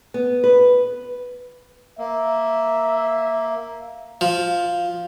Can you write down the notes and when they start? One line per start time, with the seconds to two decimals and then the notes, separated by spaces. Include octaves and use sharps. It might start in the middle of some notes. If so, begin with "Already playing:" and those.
0.14 B3
0.44 B4
1.98 A#3 E5
4.21 F3